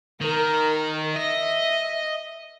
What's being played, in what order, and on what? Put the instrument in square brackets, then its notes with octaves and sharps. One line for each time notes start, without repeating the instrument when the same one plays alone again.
[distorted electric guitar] D#3 [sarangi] A#4
[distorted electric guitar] D#5 [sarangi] E5